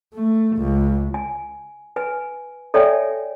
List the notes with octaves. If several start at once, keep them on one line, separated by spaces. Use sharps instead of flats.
A3
C#2
G#5
B4 G#5
A4 C#5 D5 E5 G5 G#5